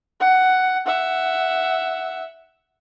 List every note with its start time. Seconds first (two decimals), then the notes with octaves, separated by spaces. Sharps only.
0.20 F#5
0.86 E5 F#5